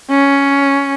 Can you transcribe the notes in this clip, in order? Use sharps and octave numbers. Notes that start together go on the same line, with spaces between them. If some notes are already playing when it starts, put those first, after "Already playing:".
C#4